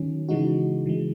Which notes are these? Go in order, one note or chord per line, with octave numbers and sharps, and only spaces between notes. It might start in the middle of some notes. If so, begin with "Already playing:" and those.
Already playing: D#3 F#3 C#4
C#3 E3 G#3 D#4 F#4
C#3 E3 G#3